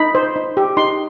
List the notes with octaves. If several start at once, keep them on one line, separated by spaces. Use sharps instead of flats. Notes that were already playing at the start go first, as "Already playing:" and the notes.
Already playing: D#4 B5
C5
D#4
G4
D#4 C6